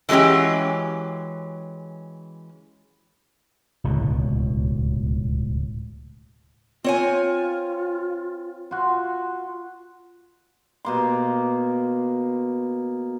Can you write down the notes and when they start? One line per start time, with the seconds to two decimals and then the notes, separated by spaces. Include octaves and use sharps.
0.09 E3 F#3 G#3 C#4 G4
3.84 D1 C#2 B2 D3
6.84 C4 F4 C#5 G#5
8.71 F4 F#4
10.85 B2 A#3 C6